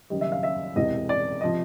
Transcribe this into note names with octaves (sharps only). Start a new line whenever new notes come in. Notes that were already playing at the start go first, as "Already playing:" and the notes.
F#1 F#2 D#3 G3 D#5
E5
F5
E5
E1 E2 C3 D#5
D5
C3 F3 D#5